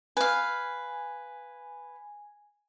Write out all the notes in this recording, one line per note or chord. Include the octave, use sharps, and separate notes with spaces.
B4 F5 G#5